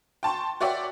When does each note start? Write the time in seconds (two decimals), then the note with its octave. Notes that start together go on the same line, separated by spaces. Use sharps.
0.23 G5 A5 C6 C#6
0.60 F#4 C#5 D5 E5 G5